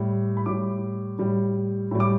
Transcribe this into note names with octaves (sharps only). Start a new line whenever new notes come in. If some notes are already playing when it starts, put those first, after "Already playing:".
Already playing: A2 G3
B5
A2 G3 D6
A2 G3
A2 G3
D6